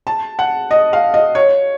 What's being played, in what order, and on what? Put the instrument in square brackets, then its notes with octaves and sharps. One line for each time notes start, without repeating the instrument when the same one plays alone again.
[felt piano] A5
F#5
D#5
F5
D#5
C#5